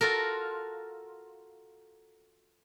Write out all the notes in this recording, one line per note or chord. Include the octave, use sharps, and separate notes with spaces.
F4 F#4 A4 A#4